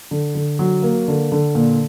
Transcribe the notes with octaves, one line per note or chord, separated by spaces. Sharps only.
D3
D3
F#3
A#3
D3
D3
A#2